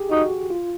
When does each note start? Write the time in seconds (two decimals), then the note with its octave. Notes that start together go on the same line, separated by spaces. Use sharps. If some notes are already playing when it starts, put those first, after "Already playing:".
Already playing: G4 G#4
0.11 D#4 F#4
0.50 F4